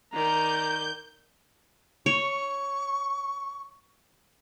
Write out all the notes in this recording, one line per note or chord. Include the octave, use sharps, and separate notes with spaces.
D#3 D5 A#5 G6
C#5 C#6